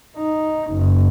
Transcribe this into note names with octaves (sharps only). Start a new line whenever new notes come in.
D#4
F#1